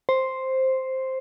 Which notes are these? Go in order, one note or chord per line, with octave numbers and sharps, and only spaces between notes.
C5